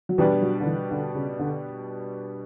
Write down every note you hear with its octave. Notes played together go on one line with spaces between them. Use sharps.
F#3
B2 E3 G3 D4 G4 B4
F#3
D3
E3
D3
C#3
D3